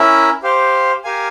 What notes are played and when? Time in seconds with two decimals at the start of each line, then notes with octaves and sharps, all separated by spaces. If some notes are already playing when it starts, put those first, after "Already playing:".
Already playing: C#4 E4 A#4 E5
0.43 G4 C5 F5
1.04 G4 A#4 F5 G#5